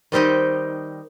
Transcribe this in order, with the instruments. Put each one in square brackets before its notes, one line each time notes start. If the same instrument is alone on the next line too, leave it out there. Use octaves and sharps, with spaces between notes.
[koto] D#3 G3 C4 D#4 G4